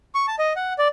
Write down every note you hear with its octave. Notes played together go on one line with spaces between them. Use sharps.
C#6
A5
D#5
F#5
D5